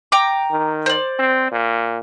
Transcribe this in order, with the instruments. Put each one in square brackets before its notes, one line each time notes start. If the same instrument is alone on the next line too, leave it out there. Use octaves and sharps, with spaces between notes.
[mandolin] G5 A#5 D6
[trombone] D#3
[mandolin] C5 D5
[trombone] C4
A#2